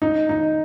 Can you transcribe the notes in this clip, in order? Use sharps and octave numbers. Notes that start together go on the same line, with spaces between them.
D#4
D#4